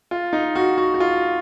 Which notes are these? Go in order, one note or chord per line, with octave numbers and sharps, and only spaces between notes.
F4
D#4
F#4
F#4
F#4
F4